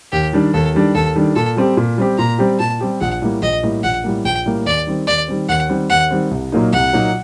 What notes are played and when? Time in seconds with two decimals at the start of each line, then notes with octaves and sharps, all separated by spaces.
0.12 D#2 G4
0.33 D#3 G3 D4
0.54 D#2 A4
0.74 D#3 G3 D4
0.95 D#2 A4
1.15 D#3 G3 D4
1.35 A#2 A4
1.57 G3 C4 G4
1.77 A#2
1.98 G3 C4 G4
2.18 A#2 A#5
2.39 G3 C4 G4
2.59 A#2 A5
2.81 G3 C4 G4
3.01 A#1 F#5
3.22 A2 G3 A#3
3.42 A#1 D#5
3.63 A2 G3 A#3
3.83 A#1 F#5
4.04 A2 G3 A#3
4.25 A#1 G5
4.46 A2 G3 A#3
4.66 D#2 D5
4.87 D#3 G3 C4
5.07 D#2 D5
5.28 D#3 G3 C4
5.49 D#2 F#5
5.69 D#3 G3 C4
5.90 D#2 F#5
6.11 D#3 G3 C4
6.31 C2
6.52 A#2 F#3 A#3 D#4
6.73 C2 F#5
6.93 A#2 F#3 A#3 D#4